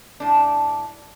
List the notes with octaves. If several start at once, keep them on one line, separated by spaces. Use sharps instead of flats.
A2 D4